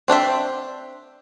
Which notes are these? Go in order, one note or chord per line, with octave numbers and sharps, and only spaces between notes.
C4 D4 C5 E5